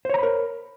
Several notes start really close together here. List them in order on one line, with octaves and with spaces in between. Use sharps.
C5 C#5 A#5 B5 A#4